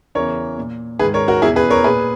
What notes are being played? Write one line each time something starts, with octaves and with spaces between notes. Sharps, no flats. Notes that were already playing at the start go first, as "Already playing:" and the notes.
E2 C#3 E3 A#4 C#5
A#2
G#2 D#3 G#4 B4
A#4 C#5
F#4 A#4
E2 B2 E4 G#4
G#4 B4
A#4 C#5
A#2 G#4 B4